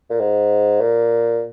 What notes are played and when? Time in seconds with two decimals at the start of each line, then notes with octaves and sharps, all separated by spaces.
0.10 A#2
0.20 G#2
0.81 A#2